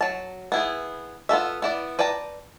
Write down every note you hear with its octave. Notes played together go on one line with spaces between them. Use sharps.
F#3 A5
B3 E4 G#4
B3 F4 A4 E5
B3 E4 D5
B4 D5 G5 A5 A#5